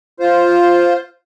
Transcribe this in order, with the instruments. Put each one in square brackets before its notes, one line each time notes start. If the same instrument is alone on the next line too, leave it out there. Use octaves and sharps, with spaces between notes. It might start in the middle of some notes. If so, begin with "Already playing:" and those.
[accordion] F4 C5